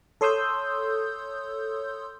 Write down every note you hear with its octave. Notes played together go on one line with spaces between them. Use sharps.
A4 C#5 C6 D#6 E6 G6